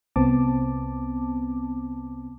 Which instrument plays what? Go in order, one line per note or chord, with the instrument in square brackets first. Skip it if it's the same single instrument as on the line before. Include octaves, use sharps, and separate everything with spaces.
[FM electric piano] C2 B3 C4 A5 D6